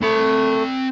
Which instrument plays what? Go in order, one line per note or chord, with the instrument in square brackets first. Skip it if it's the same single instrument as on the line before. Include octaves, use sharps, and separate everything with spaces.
[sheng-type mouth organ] A3 [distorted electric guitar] C4 B5